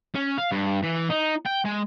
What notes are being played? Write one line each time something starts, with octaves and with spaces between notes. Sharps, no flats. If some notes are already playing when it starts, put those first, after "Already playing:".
C#4
F5
G2
E3
D#4
G5
G#3